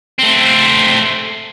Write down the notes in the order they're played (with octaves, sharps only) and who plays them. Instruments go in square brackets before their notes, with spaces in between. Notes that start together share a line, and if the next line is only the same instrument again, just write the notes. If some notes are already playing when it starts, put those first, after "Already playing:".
[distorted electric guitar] A3 C4